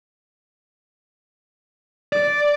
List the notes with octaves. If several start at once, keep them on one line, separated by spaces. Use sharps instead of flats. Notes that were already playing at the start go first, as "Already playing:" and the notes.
D5